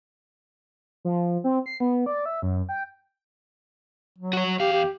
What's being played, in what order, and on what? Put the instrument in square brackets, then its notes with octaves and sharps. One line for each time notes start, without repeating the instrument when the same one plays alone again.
[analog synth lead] F3
C4
C7
B3
D5
E5
F#2
G5
[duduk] F#3
[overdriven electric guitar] F#4 C#5
[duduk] F#3
[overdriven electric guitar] E2 F5 [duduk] G4
[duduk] G4